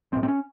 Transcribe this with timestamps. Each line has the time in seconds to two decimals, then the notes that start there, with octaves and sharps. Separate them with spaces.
0.12 B1 C4
0.16 A2
0.23 C4
0.28 C#4